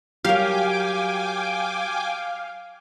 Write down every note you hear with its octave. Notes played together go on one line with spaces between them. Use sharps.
F#3 G4 A#4 C#5 F5 G5 G#5 D6